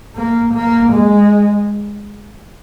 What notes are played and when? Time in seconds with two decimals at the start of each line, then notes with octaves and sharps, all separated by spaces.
0.15 A#3
0.54 A#3
0.93 G#3